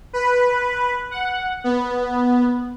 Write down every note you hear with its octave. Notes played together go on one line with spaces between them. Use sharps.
B4
F#5
B3